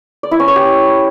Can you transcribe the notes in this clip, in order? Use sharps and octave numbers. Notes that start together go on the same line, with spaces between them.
D5
E4
C#4
C#5
G4